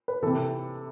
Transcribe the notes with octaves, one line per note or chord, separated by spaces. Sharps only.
B4
C3 E3 A4